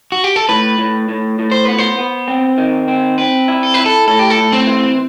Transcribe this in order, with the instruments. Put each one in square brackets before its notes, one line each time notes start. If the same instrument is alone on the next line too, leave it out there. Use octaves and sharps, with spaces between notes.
[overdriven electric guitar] F#4
G4
A4
[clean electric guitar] A2 [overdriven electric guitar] B4
[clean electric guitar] A2
A2
A2
[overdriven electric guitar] C5
[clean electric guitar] B3 [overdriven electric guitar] B4
[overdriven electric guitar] C5
[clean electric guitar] B3
C4
D#3
C4
[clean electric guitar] C4 [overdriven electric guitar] B4
[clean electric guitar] E4
[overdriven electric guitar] A4
[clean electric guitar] E4 [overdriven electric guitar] B4
[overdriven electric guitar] A4
[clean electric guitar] A2 [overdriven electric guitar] A4
[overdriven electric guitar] G4
A4
[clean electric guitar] A2
[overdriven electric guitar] C4
[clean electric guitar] E3